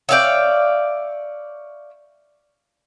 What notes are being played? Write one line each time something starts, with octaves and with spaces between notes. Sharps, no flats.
C#5 D5 E5 F5 G5